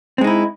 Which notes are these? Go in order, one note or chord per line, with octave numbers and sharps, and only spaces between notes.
G#3 C4 D#4 E4